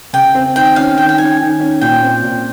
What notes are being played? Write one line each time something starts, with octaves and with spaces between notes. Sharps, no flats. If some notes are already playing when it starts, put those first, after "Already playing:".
C#3 G5
C4
D#3 G5
C#4 F5
D#3 G5
G5
C#4 G#5
D#3
C#4
A#2 G5
C4
A#2